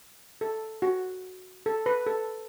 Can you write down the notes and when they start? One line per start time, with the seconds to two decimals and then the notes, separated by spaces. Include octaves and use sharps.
0.41 A4
0.82 F#4
1.66 A4
1.86 B4
2.07 A4